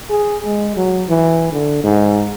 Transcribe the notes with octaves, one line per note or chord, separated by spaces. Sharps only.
G#4
G#3
F#3
E3
D3
G#2